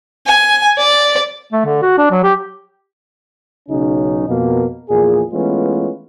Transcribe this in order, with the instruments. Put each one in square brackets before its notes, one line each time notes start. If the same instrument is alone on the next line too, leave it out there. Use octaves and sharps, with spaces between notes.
[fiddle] G#5
D5
[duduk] A3
D3
F#4
D4
F#3
G4
[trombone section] B1 C#3 F#3 C#4 D#4
F2 B2 A#3
E2 A#2 F3 G#4
E3 G#3 A3 B3 C#4 F4